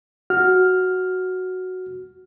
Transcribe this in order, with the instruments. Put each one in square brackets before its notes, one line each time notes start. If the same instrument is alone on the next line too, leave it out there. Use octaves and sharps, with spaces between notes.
[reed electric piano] F#4 F6